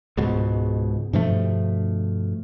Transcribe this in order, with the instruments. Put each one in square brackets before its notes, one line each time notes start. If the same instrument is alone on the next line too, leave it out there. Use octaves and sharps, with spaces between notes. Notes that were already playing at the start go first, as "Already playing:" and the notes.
[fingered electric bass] C#2 G#2 B2
G2 B2 F3 A3